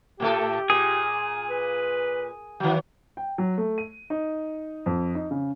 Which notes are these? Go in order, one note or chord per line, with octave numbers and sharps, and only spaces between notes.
A2 A3 G4 A4
A#2 G#4
B4
D#3 F#3
G5
F#3
A3
D#7
D#4
F2
D#4
C#3